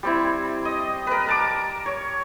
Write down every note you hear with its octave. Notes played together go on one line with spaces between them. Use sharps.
G3 C4 E4
D#5
A#4 B4
A#4 A5 D6
C#5